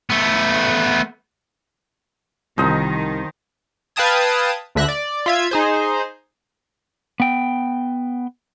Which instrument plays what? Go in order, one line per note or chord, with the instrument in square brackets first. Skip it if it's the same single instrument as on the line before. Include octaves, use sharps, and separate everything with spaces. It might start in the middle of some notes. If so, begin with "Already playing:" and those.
[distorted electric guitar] A3 B3
[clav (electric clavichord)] C2 [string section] D#3 [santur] F3 D#4 D#5
[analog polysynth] B4 F5 G5 A5 D#6 G#6
D2 D3 E5 F#6 A#6
D5
F4 E5 G#6
D#4 G#4 C5
[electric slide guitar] B3 G5